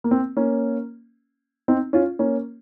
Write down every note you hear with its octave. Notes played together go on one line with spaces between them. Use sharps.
A#3
C4
A#3 C#4
C4 D#4
C#4 F4
A#3 C#4